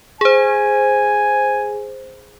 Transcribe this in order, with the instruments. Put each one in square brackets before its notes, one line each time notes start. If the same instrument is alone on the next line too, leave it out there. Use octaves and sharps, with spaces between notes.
[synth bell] G#4 C5 [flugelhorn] G#5